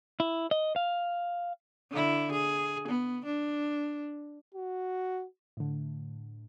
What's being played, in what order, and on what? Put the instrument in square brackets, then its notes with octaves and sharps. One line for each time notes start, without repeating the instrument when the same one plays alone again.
[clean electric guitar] E4
D#5
F5
[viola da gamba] D3 E4
G#4
B3
D4
[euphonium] F#4
[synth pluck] A2 D3